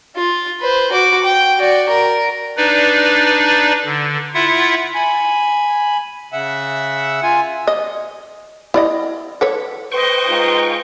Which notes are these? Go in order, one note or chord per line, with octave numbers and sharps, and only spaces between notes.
F4
B4 C5
F#4 D6
G5
F#4 D5
A#4
D4 D#4 B4 D5
D3
E4 F4 E5 F#5
G#5 B5
C#3 E5 F#5 E6
F4 G#5
D#5
E4 D5 D#5
A4 B4 C#5
B4 C5 D#5 G5 C#6
G#3 D#4 F4